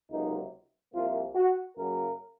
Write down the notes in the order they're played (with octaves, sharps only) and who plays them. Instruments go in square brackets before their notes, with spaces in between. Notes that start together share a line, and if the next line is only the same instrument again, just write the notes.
[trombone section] C#2 C3 F#3 A#3 D#4
C2 C3 F3 A#3 F4
F#4
F#2 C#3 F#3 A#3 A#4